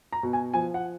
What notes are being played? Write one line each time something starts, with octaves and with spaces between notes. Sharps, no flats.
A#5
B2
G#5
F3 G#5
F#5